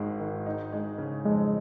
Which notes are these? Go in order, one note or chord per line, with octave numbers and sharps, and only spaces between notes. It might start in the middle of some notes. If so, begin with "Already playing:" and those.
Already playing: G#1 G#2 D#3 G#3
D#3
D#4
G#3
C#3
F2 G#3